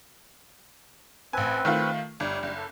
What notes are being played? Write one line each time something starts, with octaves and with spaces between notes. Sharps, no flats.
A1 C4 B4 G#5
D#3 A3 F4
G1 G3
F#1
A4